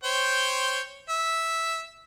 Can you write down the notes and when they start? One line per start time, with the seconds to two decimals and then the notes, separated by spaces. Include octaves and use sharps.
0.04 C5 C#5 G5
1.09 E5